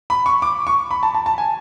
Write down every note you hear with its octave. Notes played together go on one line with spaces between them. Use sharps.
B5
C#6
D6
C#6
B5
A5
A5
A5
G#5